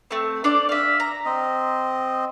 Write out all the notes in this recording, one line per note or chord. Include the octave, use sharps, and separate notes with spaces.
A3 C4
D4 C5 D5
E5 F5
A#5
C4 D#5